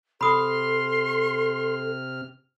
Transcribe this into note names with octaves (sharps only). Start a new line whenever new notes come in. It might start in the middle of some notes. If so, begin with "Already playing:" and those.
C3 A4 B5 C6 D#6 F6